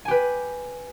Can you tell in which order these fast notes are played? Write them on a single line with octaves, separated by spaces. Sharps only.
G#5 G4 B4